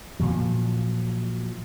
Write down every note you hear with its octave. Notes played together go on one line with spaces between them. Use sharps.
A#2 F3 F#3